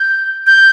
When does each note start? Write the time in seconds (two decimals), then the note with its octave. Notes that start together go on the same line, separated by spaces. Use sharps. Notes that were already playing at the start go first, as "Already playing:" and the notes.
Already playing: G6
0.46 G6